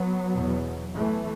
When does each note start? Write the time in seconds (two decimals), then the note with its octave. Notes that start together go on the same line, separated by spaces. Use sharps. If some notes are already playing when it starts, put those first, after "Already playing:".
Already playing: F#3 B3
0.31 E2 B2
0.95 E3 A3